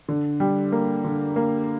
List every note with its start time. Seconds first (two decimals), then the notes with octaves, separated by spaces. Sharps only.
0.09 D3
0.40 G3
0.72 A#3
1.05 D3
1.36 A#3